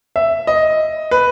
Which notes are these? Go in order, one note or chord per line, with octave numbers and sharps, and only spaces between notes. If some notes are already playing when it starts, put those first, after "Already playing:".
E5
D#5
B4